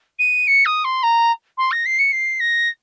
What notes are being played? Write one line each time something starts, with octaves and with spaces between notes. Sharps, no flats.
D#7
C#7
D#6
C6
A#5
C6
A#6
C7
C#7
C7
A#6